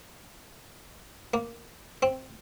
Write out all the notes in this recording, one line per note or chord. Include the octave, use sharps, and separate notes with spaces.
A#3
C4